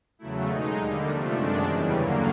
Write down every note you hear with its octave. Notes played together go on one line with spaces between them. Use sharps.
E2 C#3 F#3 A3 E4
B2 G#3 D#4
D#2 D3 G3 A#3
C3 F3 A3 D4
F#2 D#3 G#3 D4
E2 C#3 E3 G3
G2 D3 F#3 A#3 C#4